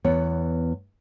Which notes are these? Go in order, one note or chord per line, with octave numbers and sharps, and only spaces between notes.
E2 B3 C#5